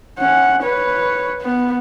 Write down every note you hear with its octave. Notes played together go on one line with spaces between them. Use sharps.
C#4 F#5
B4 C#5
B3